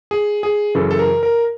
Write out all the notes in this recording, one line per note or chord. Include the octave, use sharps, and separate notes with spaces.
G#4
G#4
F#2 C#3 E3 A4
A4
A#4
A#4